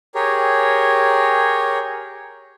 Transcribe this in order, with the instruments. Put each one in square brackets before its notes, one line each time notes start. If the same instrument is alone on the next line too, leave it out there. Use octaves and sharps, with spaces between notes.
[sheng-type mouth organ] G4 G#4 A#4 C#5